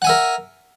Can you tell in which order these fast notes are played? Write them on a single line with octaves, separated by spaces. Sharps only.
F#5 G#5 E5 A#4